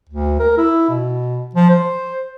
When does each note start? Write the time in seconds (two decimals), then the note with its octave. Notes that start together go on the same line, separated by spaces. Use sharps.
0.09 D2
0.39 A#4
0.57 E4
0.89 B2
1.54 F3
1.69 C5